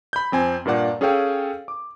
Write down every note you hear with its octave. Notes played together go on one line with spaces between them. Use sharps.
B5 G6
F2 C4 G#5
G2 A#2 A#3 D5 F#5
C#4 G#4 A4 C#5 F5 G5
D6